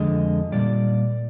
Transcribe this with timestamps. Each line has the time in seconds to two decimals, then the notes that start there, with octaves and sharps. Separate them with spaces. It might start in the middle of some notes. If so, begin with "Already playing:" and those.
Already playing: F2 D3 G#3 D#5
0.52 A#2 G3 D5